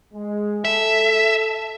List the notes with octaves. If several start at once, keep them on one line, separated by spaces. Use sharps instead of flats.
G#3
A4 E5